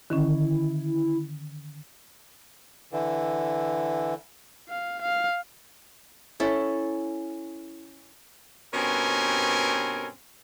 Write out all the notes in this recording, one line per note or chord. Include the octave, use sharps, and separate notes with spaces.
D3 D#3 C#4 E4
D3 E3
F5
F5
C#4 E4 A4
G2 B2 C4 C#4 A#4 G#5